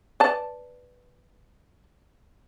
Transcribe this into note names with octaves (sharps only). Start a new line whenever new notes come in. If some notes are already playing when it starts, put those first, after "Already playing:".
B4 D5 A5